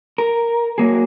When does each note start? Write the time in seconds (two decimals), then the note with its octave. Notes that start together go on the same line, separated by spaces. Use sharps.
0.18 A#4
0.78 F#3 A#3 G#4